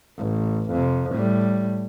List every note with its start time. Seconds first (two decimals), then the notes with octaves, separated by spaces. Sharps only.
0.17 A1
0.71 F2 C3
1.11 A2 G3